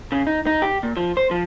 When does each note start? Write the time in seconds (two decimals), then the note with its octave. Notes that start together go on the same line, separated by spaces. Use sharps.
0.12 C#3
0.27 D#4
0.47 D#4
0.62 G4
0.83 A#2
0.97 F3
1.17 C5
1.31 F3